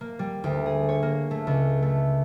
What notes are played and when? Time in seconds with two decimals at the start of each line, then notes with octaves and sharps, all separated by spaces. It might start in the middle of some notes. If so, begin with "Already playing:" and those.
0.01 A#3
0.19 G3
0.44 D2
0.66 G#4
0.89 C#5
1.02 A#3
1.31 A3
1.47 C#2
1.82 A3